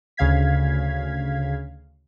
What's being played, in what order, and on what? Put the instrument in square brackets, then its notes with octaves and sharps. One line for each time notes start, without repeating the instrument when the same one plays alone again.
[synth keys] D2 C#3 F5 G#6 B6